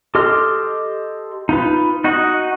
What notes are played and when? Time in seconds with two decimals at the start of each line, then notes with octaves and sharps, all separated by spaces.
0.15 G4 A4 D#5 C6 F6
1.49 D#4 F4 B4
2.04 D#4 F#4 D#5 F#5